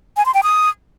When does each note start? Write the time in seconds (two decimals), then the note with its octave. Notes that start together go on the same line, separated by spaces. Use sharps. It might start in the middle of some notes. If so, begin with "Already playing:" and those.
0.17 G#5
0.26 C6
0.34 G5
0.43 D#6